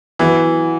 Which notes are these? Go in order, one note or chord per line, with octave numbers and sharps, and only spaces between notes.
E3 F#3 B3 E4 B4